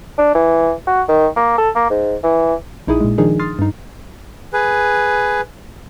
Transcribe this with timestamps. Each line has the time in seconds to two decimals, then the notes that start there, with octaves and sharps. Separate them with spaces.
0.18 D4
0.34 E3
0.87 F#4
1.09 D#3
1.37 A#3
1.58 A4
1.75 A#3
1.90 G#2
2.23 E3
2.87 A#1 D#4 E4 G#4 D#6
3.00 A#2 G#3
3.18 D#3 F3 D4 D#4 G#4
3.39 C6 D#6 F6 A6 C7
3.59 G2 D#4
4.53 G#4 B4